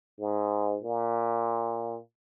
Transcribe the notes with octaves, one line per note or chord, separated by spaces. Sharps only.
G#2
A#2